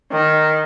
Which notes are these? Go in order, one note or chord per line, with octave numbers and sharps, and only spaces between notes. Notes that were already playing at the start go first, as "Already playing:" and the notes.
D#3